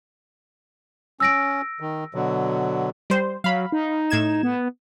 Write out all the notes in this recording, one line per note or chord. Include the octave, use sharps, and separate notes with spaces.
C#4 E6 A#6 D7
D#3
B2 D3 F#3
G3 C5
F#3 F5 B5
D#4
A2 G#6 E7
B3